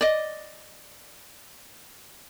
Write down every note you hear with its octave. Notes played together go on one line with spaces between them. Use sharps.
D5 D#5